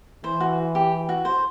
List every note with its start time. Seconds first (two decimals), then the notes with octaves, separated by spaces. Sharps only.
0.24 E3 C5
0.40 F#4
0.75 G4
1.09 F#4
1.25 C5